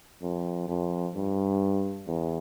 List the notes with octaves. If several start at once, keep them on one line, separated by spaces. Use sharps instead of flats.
F2
F2
G2
E2